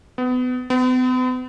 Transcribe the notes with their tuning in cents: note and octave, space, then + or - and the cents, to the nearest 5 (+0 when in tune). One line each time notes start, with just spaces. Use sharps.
B3 +30
B3 +45